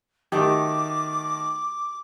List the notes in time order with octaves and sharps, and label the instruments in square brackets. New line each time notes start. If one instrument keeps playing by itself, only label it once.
[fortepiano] D#3 A3 D#4 [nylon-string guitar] F#4 G4 E5 [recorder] D6